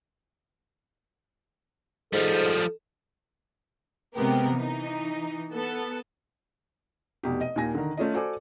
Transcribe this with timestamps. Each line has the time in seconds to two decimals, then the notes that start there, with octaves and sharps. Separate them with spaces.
2.13 G#2 F3 G3 A4
4.15 C3 G#3 B3 G4 A#4
4.53 E3 D#4
5.52 B3 A4
7.23 F1 B2 G4
7.41 D#5
7.56 D#2 A#2 G#5 A#6
7.75 D3 D#3
7.97 A3 C#4 F4 D#5
8.14 F#4 A4 C5 D5 G#5 D6